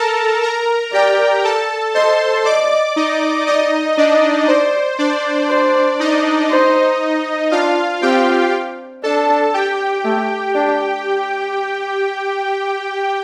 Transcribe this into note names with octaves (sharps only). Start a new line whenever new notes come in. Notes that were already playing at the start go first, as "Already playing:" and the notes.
Already playing: A4 A#4 A5 A#5
A#4 A#5
G4 D5 G5
A4 A5
C5 D#5 C6
D5 D#5 D6
D#4 D#5
D#4 D5 D#5
D4 D5 D#5
C5 D5
D4 D5
C5
D#4 D#5
C5
D4 F4 F5
C4 G4 G5
D4 A4 A5
G4 G5
A3
D4